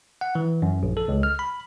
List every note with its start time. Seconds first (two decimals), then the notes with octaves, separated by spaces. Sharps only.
0.21 F#5
0.35 E3
0.62 F#2
0.83 A#1
0.97 A4
1.08 C#2
1.23 F6
1.39 B5